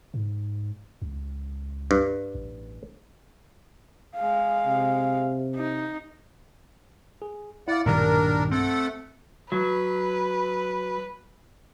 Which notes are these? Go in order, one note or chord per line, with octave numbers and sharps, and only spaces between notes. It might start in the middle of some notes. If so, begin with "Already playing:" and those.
G#2
C#2
G2
A1
G#3 F5
C3
D#4
G#4
E4 D5 F5 F#5
B1 G2 A#2 D#3 G3 D4 A#4
A3 C4 A4 F#5
F#3 B4